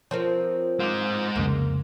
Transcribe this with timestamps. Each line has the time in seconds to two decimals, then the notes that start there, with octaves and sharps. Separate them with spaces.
0.11 F3 C4 A#4 C5 C#5
0.80 G#3 C5 F5 D6
1.36 C2 F2 C#3 A#3